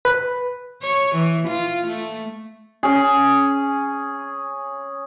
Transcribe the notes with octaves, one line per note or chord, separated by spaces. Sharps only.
B4
C#5
E3
F4
A3
C#4 G#4